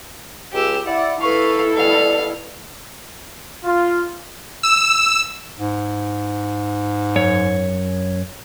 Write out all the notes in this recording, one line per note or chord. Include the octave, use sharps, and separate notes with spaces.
C#2 G4 E6
E4 D5 F#5
E4 A4 B4 F5 C#6
B2 G3 F5
F4
E6
G#2
F#2 C#5